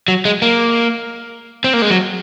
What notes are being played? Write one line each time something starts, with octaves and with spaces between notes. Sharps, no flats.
F#3
G#3
A#3
C4
A#3
G#3
F#3